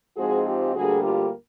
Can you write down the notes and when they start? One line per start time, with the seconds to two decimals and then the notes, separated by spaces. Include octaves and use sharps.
0.17 G#2 F3 G#3 C4 F#4 G#4
0.46 F4 G4
0.75 D2 D3 G3 A#3 F#4 G#4
1.03 F4 G4